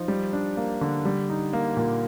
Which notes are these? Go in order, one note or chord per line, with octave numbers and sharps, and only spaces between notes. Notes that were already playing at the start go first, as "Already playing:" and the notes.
Already playing: F3 D#4
G3
D4
A#3
D3
G3
D#4
A#3
A#2